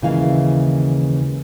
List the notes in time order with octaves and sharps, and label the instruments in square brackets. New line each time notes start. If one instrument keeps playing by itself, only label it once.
[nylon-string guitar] D#2 C#3 E3 G#3 E4 F5